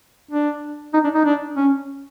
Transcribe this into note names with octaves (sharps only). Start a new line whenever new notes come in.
D4
D#4
D4
D#4
D4
C#4